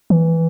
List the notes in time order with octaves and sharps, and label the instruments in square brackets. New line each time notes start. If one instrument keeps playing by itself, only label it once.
[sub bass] E3